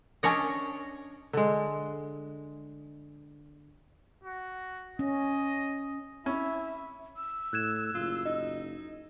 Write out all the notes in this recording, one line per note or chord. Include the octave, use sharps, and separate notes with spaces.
C#4 D4 C#5 D#5
D3 G#3
F#4
C#4 D#5
C#4 E4 E5
E6
A2 F#6 G#6 E7
F#1 F4
D#4 D#5